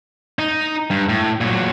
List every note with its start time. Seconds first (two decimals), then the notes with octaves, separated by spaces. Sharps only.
0.39 D#4
0.90 G2
1.09 A2
1.41 A#2 F#3